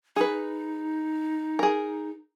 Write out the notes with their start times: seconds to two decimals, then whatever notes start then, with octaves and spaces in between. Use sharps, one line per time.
0.16 D#4 G#4 B4
1.59 G#4 A#4